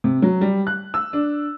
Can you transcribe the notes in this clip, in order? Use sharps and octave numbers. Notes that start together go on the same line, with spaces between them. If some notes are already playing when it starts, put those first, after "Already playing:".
C3
F#3
G3
F#6
E6
D4